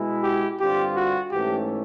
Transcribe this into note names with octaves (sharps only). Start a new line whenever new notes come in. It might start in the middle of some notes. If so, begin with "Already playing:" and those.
Already playing: B2 G#3 B3 E4
G4
G2 D3 G3 C4 F4 G4
F#4
G#2 E3 A3 C#4 G4